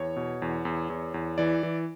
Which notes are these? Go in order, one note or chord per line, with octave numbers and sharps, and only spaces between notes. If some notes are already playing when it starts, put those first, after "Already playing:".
Already playing: E2 C#5
B2
E2
E2
E2
E2
E3 D5
E3